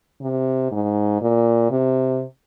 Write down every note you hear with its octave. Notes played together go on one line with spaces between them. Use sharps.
C3
G#2
A#2
C3